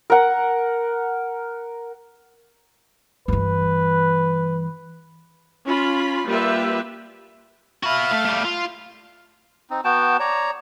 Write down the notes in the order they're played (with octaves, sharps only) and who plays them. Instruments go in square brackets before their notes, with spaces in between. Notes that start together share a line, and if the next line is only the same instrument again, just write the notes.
[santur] A#4 F#5
[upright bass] G2 E3 [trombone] B4
[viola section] C#4 F4 B5
G3 A#3 F4 G4 B4 E5
[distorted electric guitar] F#4 B5 [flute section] E5 F5 F6
[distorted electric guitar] A3
G3 A3
F4
[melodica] C4 D#4
B3 F#4 G5 A5
C#5 D5 A#5